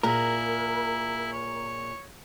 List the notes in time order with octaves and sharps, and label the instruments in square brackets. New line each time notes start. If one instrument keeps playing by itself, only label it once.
[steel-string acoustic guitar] A#2 G#4 [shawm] E4 [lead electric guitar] A#4
[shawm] C#5